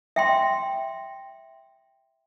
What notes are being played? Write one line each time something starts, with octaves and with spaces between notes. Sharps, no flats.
E5 G5 C6